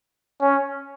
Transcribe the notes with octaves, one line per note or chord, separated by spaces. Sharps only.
C#4